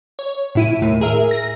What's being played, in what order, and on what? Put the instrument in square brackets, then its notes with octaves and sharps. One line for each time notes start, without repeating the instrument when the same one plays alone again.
[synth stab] C#5
A2 E4 D#7
D#2 A2
G#4 A#4 E5
A#6